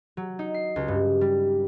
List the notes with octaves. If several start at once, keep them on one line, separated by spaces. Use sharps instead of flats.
F#3
D#4
C7
C#2
G2
G3